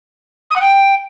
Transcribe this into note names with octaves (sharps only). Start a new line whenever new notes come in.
D#6
F#5
G5